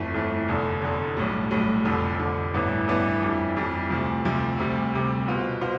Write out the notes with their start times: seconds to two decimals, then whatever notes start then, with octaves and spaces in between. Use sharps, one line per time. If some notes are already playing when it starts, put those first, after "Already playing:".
Already playing: G1 F2 E3 A3
0.14 G1 F2 E3 A3
0.48 F1 E2 D3
0.82 F1 E2 D3
1.17 B1 A2 G3
1.51 B1 A2 G3
1.85 F1 F2 D3
2.19 F1 F2 D3
2.54 A1 G2 E3 B3 D4
2.88 A1 G2 E3 B3 D4
3.22 F2 E3 G3
3.57 F2 E3 G3
3.90 D2 C3 F3
4.25 D2 C3 F3
4.59 D2 C3 G3
4.93 D2 C3 G3
5.27 B2 B3 F4 C5
5.61 B2 B3 F4 C5